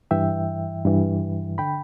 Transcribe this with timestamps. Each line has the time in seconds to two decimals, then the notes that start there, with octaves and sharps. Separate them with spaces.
0.11 G2 E3 E5 G5
0.85 G2 E3
1.58 D3 G5 B5